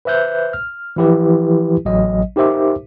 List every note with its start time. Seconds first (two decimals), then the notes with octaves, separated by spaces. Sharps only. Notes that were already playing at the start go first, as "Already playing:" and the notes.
0.05 B4 C5 E5 F#6 G6
0.53 F6
0.96 E3 F3 E4 G4 B4
1.85 A1 F#3 D#5
2.36 D#4 G4 A#4 C5 E5 D6